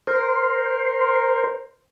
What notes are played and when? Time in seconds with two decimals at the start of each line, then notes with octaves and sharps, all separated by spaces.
0.07 A#4 C5